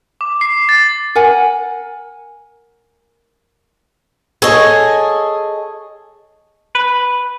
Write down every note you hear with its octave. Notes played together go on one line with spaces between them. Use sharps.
D6
C7
A6
A#4 F#5 G#5
G#4 A4 C#5 D#5 G#5
B4